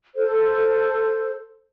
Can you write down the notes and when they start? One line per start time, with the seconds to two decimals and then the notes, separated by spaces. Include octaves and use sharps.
0.15 A4 C5